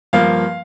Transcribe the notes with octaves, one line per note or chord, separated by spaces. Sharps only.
G2 F3 A#3 F5